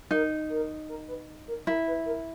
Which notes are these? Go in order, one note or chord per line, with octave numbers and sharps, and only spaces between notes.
D#4 A#4
A#4
A#4
B4
A#4
E4 A#4
B4
A#4